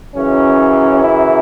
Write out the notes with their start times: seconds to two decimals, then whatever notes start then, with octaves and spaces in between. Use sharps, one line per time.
0.15 F#2 C#3 E3 C#4
1.01 E4